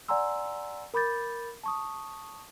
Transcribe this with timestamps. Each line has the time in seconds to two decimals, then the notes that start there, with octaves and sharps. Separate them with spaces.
0.08 D5 F#5 G#5 A#5 C6 E6
0.94 A#4 B5 D6 G6 A6
1.64 A5 C#6 D#6